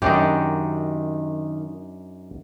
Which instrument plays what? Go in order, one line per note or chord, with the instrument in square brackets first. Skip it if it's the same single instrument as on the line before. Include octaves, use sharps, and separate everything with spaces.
[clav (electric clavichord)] F#2 D4 D#4 [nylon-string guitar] D#3 F#4 G4